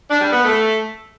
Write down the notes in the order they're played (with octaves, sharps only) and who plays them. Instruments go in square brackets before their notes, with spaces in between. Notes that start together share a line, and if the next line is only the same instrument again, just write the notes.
[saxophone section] D4
G3
B3
A3